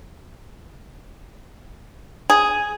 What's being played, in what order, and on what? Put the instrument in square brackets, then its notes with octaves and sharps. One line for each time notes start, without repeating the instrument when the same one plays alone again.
[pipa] G#4